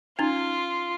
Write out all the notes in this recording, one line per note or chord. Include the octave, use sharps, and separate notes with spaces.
C#4 D#4 F4